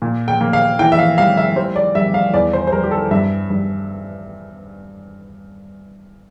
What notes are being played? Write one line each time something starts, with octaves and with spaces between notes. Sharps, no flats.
A#2
G5
A#3
F5
E3 G5
E5
F5
G3 F5
E5
G3 C5
D5
G3 E5
F5
E2 D5
C5
C5
G3 A#4
G4
A4
G2 E5
G2